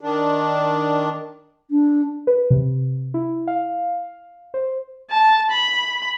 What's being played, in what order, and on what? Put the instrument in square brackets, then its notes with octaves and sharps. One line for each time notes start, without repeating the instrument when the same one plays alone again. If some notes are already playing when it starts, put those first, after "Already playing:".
[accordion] D#3 D4
[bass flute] D4
[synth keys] B4
C3
E4
F5
C5
[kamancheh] A5
B5